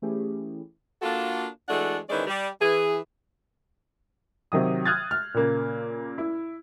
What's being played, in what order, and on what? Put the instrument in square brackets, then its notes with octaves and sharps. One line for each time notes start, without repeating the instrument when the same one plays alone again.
[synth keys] E3 A3 C#4 E4 G4 G#4
[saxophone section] A#3 D4 F4 F#4 A4
E3 G#3 A3 D4 F#4 F#5
D#3 E3 G#3 C#4 C5 D5
G3
E3 G#4
[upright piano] C3 D#3 F#3 D#6
D#6 F6 F#6 G#6 A6
F6
A#2 C#3 A#3
E4